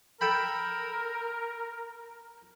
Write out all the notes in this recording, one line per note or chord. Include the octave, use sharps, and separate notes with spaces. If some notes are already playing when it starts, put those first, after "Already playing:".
A4 A#4 G5 B5